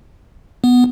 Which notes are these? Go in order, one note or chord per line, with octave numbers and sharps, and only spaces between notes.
B3